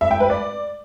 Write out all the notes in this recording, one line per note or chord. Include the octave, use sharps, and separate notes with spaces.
E5
G5
B4
D5